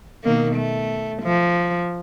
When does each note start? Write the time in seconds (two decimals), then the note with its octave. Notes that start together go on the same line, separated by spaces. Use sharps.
0.24 B2 D#3 A#3
0.56 A3
1.23 F3